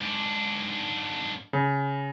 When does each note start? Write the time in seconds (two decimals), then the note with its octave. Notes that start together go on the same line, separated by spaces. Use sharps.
0.01 G#2 D4
1.53 C#3